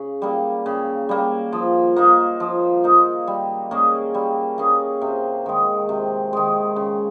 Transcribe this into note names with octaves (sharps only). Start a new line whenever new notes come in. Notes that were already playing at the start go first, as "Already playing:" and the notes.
Already playing: C#3
G3 A#3
C#3
G3 A#3
F3
A#3 D#4
F3
A#3 D#4
G3
A#3 C#4 G#4
G3
A#3 C#4 G#4
C3
D#3 G#3
C3
D#3 G#3
C#3